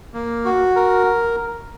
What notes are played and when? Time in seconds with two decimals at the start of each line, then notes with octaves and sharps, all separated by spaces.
0.14 A#3
0.45 F#4
0.76 A#4